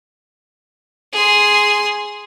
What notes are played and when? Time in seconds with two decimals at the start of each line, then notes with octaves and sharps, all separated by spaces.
1.13 G#4 C6